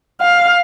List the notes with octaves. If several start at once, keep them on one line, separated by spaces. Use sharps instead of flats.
F5